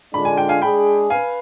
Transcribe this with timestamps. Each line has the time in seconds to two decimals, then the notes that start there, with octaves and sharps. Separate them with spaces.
0.13 D3 G#3 D4 F4 B5
0.25 G#5
0.38 G5
0.49 F5 G#5
0.62 G#3 D4 G#4 G5 B5
1.10 B4 F5 G#5